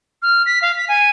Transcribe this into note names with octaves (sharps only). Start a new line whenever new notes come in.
F6
B6
F5
B6
G#5